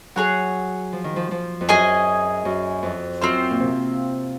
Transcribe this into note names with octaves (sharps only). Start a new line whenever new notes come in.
F#3 G#4 C#5 F#5
F3
D#3
F3
F3
F2
F#2 G#4 D#5 G#5
F#2
F2
F#2 C4 F4 C5
A#2
C3